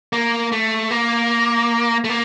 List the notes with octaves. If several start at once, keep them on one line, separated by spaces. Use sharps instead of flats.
A#3
A3
A#3
A3
A#3